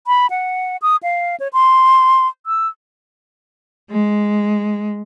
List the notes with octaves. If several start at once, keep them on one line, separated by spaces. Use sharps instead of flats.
B5
F#5
D#6
F5
C#5
C6
E6
G#3